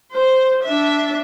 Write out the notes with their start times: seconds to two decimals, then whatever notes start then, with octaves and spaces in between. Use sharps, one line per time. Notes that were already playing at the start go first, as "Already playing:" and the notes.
0.12 C5
0.63 D4 E5